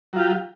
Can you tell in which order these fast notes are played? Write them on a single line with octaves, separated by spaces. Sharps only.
F#3 F4 G4